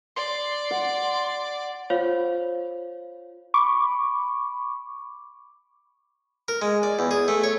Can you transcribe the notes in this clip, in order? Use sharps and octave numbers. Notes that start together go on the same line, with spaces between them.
D5 C6
F#5
F4 C5 C#5 F5
B5 C#6 D6
A#4
G#3
D5
E2
G#4
A3
C#5